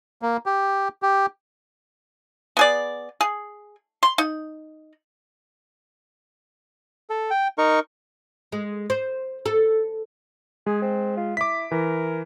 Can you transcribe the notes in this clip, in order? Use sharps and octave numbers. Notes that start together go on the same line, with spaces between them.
A#3
G4
G4
B3 G#4 D5
G#4
C6
D#4
A4
G5
D#4 A#4 C#6
G#3
C5
A4
G#3 G#4
C4
F4
E4 D6 B6
E3 A#4